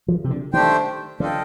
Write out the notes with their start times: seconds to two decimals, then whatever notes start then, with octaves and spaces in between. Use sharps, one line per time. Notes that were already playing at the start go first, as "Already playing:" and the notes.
0.08 F3
0.24 C3
0.30 D3
0.53 D#3 A3 D4 G4 C5 G5
1.20 D3 D4 F4 A4 D#5 G5